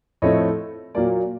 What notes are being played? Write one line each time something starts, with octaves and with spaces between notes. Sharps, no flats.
A2 F3 A3 C4 C#5 D#5
A#2 F#3 A#3 D5